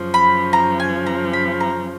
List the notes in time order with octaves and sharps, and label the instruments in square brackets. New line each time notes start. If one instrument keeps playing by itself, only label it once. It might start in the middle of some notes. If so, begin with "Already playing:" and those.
Already playing: [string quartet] F#2 C#3 F3
[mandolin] B5
A#5
G#5
A#5
B5
A#5